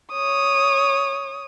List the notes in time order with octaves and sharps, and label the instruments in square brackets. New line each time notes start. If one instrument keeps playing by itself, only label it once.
[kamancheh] C#5 D#6